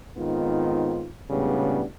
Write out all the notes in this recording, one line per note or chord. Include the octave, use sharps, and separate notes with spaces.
G#2 D#3 B3 C4 F4
C#2 A2 C#3 G3 B3 D4